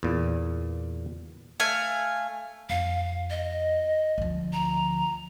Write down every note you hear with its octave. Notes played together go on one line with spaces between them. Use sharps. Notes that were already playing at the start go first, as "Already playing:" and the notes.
E2 A#2
A3 F5 G#5
F2 F5
D#5
D2 F3
A#5